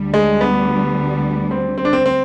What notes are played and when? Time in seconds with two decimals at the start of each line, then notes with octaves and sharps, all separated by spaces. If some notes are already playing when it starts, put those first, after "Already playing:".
Already playing: D2 D3 G3
0.14 G#3
0.41 B3
1.51 C4
1.78 C4
1.85 D4
1.93 C4
2.06 C4